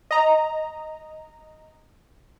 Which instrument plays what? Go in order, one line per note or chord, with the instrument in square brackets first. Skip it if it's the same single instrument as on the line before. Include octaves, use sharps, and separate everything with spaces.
[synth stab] D#5 A#5